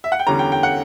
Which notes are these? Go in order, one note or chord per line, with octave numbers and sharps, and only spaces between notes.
E5
F#5
G5
E2 D3 G3 C#4 A#5
G5
G5
F#5